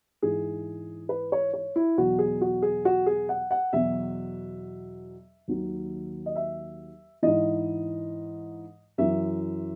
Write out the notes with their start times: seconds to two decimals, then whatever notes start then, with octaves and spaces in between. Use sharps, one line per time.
0.22 G#2 E3 G#4
1.09 B4
1.32 C#5
1.54 C#5
1.76 E4
1.98 E2 B2 F#3 F#4
2.19 G#4
2.41 F#4
2.62 G#4
2.85 F#4
3.06 G#4
3.29 F#5
3.51 F#5
3.73 E2 B2 F#3 E5
5.48 D#2 D#3 F#3
6.26 D#5
6.36 E5
7.22 G#2 E3 D#5
8.98 F#2 E3 E5